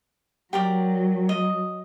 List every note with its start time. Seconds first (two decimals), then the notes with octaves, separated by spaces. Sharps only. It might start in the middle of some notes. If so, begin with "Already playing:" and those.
0.53 F#3 G4 A#4 D5
1.29 D#5